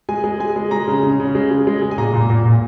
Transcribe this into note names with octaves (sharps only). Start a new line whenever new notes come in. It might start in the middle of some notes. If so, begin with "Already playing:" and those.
G#3 G#5
G#3
G#3 G#5
G#3
G#3 A#5
C#3
C#3
C#3
G#3
G#3
G#3
G#3
G#5
A#2 A#5
A#2
A#2
A#2